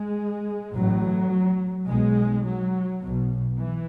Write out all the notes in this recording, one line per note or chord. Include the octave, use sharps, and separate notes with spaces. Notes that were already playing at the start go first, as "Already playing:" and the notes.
Already playing: G#3
A1 A2 F#3
B1 B2 G#3
F#3
B2
B1
E3